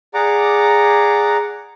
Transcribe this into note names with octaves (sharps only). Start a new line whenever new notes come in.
G#4 D5 F#5 A#5 D6